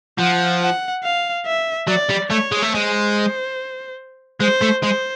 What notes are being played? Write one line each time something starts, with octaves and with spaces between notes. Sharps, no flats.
F3 F#5
F#5
F5
E5
F#3 D5
G3
A3 C#5
G#3
A3
G#3 C5
G#3 C5
A3
G#3 C5